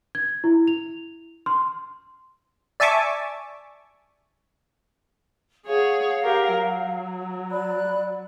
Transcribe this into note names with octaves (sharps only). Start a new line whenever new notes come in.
G#6
E4
F7
C6
D5 E5 G#5 A5 C#6 D6
G#4 C#5 F5 F#5
G4 A#4
F#3
D5 B5 F#6